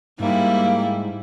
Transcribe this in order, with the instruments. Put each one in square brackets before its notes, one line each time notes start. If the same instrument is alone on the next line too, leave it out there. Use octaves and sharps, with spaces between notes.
[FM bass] G#2 [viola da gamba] G3 E4 [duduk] A#3